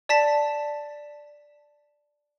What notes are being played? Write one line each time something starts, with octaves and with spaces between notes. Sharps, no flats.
D5 A5 B6